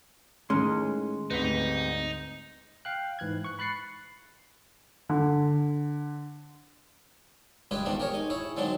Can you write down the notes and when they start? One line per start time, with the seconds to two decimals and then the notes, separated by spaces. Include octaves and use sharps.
0.50 A2 D#3 G#3 C#4 C6
1.30 D2 G#2 G3 C4 D#4 B4 B6
2.85 F5 G5 F#6
3.19 G#2 E3 F#6 G#6
3.44 C#6 F#6
3.59 B5 F#6 A6 C7 C#7
5.09 D3
7.71 C#2 G2 G#3 G4 G#4 B4
7.85 D#3 F3 B3 C4 D4
7.99 G4 G#4 A#4 C#5
8.14 D#4 G#5
8.30 E4 G#4 C#5
8.57 D3 F#3 G#3 C4 D4 D#4